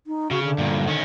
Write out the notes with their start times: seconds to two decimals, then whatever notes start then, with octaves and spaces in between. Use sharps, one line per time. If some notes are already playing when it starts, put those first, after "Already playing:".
0.07 D#4
0.31 C#3 F#4
0.43 D3
0.58 G2 A#2
0.87 D#3 C#4